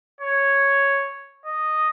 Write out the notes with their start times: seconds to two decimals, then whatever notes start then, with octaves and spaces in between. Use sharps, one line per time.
0.21 C#5
1.46 D#5